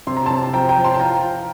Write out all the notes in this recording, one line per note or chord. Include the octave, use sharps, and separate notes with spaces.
C3 C6
A#5
C3 A5 C6
F3 G5 A#5
G5 A#5
F3
A5 C6
A5
F4 G5 A#5
F4